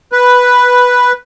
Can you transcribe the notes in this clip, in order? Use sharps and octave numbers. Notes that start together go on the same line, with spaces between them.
B4